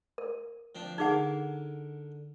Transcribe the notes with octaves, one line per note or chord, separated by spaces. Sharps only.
A#4
F3 C4 D4
D3 D#4 G#4 A#4 F#5